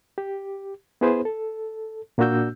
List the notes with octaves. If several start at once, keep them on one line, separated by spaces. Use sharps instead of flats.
G4
B3 E4 G#4 B4 C5
A4
A#2 A#3 D4 F#4 E6 G6